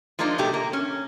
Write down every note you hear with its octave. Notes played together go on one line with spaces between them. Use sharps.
F3 G#3 A#3 D4 D#4 F4
B2 F#3 A3 G4
A#3
C#4